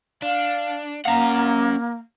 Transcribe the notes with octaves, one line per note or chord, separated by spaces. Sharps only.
D4 F5
A#3 C#4 F5 F#5 A#5